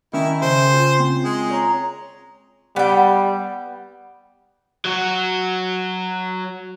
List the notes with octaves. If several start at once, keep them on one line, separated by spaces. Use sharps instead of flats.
D#3 C#4 E4 E5
C#3 C5
F4
C4
G#3
C#5 A#5
G3 B3 G5
F#3 F#4